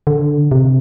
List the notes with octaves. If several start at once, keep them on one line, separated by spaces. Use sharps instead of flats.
D3
C3